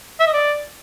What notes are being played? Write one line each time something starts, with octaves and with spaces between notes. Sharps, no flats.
E5
D#5
D5